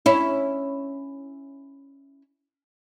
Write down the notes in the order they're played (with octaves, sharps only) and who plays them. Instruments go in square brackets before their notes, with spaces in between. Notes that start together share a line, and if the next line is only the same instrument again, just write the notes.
[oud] C#4 E4